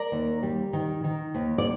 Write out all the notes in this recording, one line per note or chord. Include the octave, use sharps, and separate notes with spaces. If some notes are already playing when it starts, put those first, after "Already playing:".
Already playing: A#4 D5
D#2
G3
D#3
D#3
D#2
D5